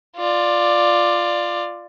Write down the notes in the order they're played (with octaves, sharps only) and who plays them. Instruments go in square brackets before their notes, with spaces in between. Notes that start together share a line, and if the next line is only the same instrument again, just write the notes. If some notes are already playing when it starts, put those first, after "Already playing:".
[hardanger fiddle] F4 D5